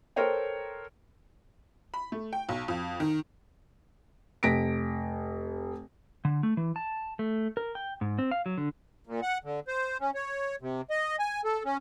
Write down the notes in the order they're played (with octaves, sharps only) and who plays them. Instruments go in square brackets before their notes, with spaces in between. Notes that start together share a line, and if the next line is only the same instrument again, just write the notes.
[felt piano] A4 A#4 C5 C#5 G5
[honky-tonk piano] B5
A3
G5
B1
F2
D#3
[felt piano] F1 A#6 B6 D7
[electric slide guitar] D3
A3
E3
A5
A3
A#4
G5
G#2
C4
F5
F#3
D3
[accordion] A#2
F#5
D3
C5
C#4
C#5
C3
D#5
G#5
A4
C#4